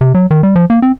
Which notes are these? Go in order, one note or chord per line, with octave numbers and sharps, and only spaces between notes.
C3
F#3
D#3
G3
F3
A#3
C4